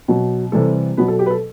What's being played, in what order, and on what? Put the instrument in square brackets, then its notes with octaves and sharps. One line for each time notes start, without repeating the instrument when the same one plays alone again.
[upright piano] B2 F#3
C3 E3 G3 A4
B2 F#3 B3 B4
A4
G4
B4
A4